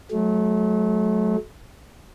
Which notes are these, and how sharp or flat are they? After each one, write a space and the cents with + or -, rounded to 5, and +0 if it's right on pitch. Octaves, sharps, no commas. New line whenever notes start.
F#3 +0 A3 -30